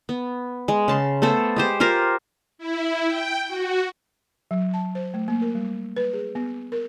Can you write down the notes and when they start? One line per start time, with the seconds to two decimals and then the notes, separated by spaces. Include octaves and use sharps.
0.09 B3
0.68 G#3
0.88 C#3 A5 C6
1.22 A3 B3 A4 C5
1.56 G#3 G4 C5
1.80 F4 G4 A#4 C5
2.58 E4
3.07 G5
3.48 F#4
4.51 F#3
4.74 A5
4.95 C5
5.14 A3
5.28 A#3
5.42 A#4
5.55 G3
5.97 B4
6.13 G#4
6.35 B3
6.72 A#4